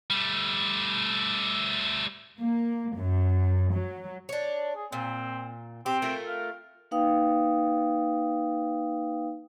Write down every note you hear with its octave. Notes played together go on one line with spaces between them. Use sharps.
G3 A3
A#3
F#2
F#3
D4 C#5
G#4
A#2 C4
C4 G4
A3 F4 A#4
F5
A#3 D#4 B4 F5 G5 D#6